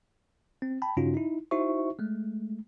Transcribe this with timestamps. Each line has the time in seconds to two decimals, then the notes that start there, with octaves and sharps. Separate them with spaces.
0.62 C4
0.82 G5 A5 B5
0.97 G2 C#3 C#4 D#4 F4 F#4
1.14 D#4 E4
1.51 D#4 E4 F#4 C5 E5 C#6
1.99 G#3 A3